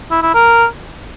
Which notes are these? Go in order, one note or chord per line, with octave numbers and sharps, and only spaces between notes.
E4
E4
A#4